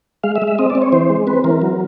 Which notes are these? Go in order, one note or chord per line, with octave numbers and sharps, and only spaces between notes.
G#3 F5
E5
G#3
E5
C4 D#5
D5
C4
C#5
E3 C5
G#3
C4 B4
E3 A#4
F#3